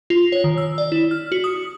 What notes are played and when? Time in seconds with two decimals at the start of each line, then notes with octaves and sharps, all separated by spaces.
0.10 F4
0.32 C#5
0.44 D#3
0.58 E6
0.78 D5
0.92 E4
1.11 F6
1.32 F#4
1.44 D#6